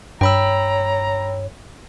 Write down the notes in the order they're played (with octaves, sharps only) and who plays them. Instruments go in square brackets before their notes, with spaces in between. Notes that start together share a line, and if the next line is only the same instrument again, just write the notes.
[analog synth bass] G2 [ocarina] C#5 [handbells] G5 B5 E6 [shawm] A#5